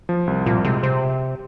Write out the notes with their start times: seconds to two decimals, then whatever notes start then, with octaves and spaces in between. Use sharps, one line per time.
0.09 F3
0.27 C2
0.46 A#2 F3
0.64 C3 G#3
0.83 C3 C5